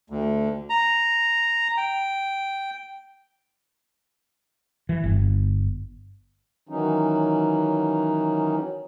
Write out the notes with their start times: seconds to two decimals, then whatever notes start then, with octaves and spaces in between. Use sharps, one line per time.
0.10 D2
0.70 A#5
1.77 G5
4.89 E3
5.04 G1
6.69 D#3 E3 F#3 C#4 D#4